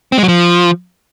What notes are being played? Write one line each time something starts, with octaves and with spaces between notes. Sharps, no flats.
C4
G#3
F#3
F3